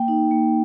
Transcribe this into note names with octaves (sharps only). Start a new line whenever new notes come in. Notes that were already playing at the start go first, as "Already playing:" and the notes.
Already playing: A#3 G5
D#4
A#3